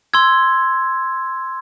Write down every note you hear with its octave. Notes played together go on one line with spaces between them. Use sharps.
C6 E6 G#6